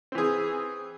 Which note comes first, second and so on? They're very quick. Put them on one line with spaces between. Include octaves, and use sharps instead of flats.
C4 E3 G#4